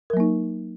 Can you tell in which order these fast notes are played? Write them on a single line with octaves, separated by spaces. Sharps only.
A#4 F#3 A#3 D#4